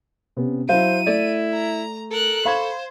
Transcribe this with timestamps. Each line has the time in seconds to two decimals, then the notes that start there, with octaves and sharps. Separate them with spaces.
0.36 C3 B3 C#4
0.69 F#3 E4 C5 F5 D#7
1.07 A3 E4 D5
1.54 A#5
2.11 A4 A#4 F#6
2.45 C5 F5 B5 C#6 G#6